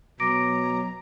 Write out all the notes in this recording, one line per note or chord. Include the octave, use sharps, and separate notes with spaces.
B2 F#3 A#5 D6 A#6 D7